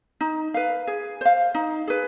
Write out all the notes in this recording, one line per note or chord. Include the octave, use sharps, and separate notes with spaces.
D#4
B4 F5
G#4
C5 F5
D#4
G#4 B4